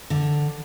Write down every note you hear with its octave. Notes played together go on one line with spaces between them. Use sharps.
D3